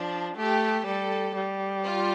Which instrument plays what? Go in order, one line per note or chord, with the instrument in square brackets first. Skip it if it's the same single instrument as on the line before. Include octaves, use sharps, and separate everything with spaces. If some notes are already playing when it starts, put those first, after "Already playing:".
Already playing: [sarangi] F3 [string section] D4
[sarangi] A3 [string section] G4
[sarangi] G3 [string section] A4
[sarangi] G3
[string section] F4